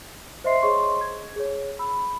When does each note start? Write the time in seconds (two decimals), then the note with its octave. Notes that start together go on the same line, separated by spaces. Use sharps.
0.44 C5 D#5 E5 C6 C7
0.62 G#4 C5 C#5 D#5 C6 C#6
1.01 G#6
1.36 G#4 C#5
1.79 B5 E6